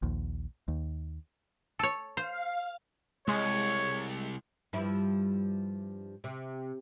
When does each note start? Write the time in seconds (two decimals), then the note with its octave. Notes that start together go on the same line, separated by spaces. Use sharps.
0.03 A#1 D#2
0.68 D#2
1.79 A4 C#5
2.17 C5 F5
3.28 C2 G#3 C#5
4.73 G2 F3 E4
6.24 C3